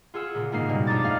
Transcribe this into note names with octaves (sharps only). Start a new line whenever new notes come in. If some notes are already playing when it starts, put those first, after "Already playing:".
F4 G#4 F#5 E6
A#2 C#3
G#2 C#3 A#3 D#4 C7
G2 B2 G3
F2 D4 D#4 A#5 D6 A6
A3 G#4 F5 F#5